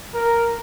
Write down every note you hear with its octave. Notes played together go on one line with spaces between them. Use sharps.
A#4